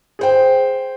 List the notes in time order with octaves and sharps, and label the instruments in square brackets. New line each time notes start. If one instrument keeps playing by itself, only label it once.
[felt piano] G#4 C5 G5